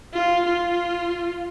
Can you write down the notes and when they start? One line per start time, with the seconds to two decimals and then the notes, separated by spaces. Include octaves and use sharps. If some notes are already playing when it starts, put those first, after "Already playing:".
0.13 F4
0.45 F4